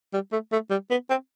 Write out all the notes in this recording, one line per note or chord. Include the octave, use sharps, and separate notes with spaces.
G3
A3
A3
G3
B3
C4